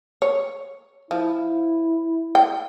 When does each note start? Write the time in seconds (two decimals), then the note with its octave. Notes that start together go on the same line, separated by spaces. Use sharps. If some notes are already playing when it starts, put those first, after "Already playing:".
0.22 C#5
1.11 F3 E4
2.35 G5